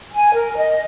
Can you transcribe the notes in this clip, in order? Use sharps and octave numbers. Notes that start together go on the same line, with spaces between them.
G#5
A#4
D#5